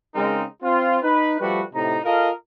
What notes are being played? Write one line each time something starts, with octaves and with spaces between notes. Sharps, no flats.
C#3 G#3 C4 D#4 A#4
C4 F4
D#4 B4
F3 G3 A3 F#4 B4
A2 C3 D#4 A#5
F4 A4 A#4 D#5 F5